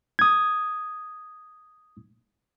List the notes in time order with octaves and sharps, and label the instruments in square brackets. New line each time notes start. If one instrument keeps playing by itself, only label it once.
[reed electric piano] D#6 G#6